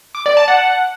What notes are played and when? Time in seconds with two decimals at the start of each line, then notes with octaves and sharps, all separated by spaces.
0.15 D6
0.26 D5
0.37 A5
0.48 F#5